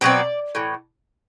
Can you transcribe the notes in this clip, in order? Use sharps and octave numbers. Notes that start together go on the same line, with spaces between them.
B2 F#3 C4 D5
A2 E3